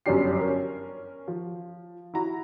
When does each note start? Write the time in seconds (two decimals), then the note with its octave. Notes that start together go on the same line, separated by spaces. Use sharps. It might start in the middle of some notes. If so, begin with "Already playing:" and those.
0.06 G1 F#2 C#4 D4 G4 C7
0.39 C#4 A#4
1.28 F3
2.14 E4 F#4 A#5